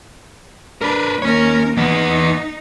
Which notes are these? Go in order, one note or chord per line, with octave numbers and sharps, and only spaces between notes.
D4 A#4 B4
D#2 C#4 A#4 C#5
E2 B3 D#4